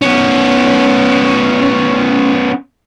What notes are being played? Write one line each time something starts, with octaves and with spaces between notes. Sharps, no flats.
B3 C#4